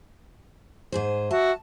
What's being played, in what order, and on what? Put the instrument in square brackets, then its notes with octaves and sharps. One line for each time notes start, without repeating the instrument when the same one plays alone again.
[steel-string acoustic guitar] G#2 G#4 C5
[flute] F#4 [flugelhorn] E5 [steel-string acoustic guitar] A5